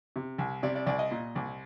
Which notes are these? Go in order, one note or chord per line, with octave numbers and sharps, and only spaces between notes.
C3
C2
C3 D5
D5
C2 D5
D#5
A#2
C2